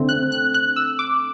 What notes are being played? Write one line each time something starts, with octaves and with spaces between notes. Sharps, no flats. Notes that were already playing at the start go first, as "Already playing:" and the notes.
Already playing: D3 A3 C4
F#6
F#6
F#6
E6
D6